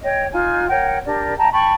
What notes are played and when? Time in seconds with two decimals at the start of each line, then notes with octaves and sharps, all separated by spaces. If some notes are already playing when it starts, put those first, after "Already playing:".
0.01 C#5 D#5 G5
0.32 D#4 F4 G#5
0.69 A#4 C#5 F#5 G5
1.06 D4 G4 A#4 D5
1.37 D#5 G5 A5 A#5
1.52 G5 A5 B5 C#6